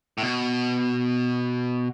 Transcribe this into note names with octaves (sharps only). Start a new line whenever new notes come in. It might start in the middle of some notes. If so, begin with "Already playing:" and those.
A2
B2